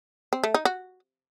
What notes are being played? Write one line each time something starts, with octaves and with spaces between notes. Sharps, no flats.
C4
A3
D#4
F#4